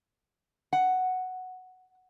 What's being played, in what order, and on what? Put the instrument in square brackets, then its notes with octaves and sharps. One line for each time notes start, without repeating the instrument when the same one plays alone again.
[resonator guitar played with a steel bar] F#5